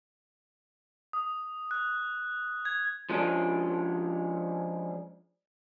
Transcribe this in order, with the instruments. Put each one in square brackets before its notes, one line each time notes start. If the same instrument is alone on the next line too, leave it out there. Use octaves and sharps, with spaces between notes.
[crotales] D#6
F#6
G#6
[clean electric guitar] F3 G#3 C#4 D4